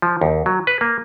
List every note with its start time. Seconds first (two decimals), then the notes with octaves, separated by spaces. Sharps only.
0.02 F3
0.21 D#2
0.46 F#3
0.67 B4
0.81 A#3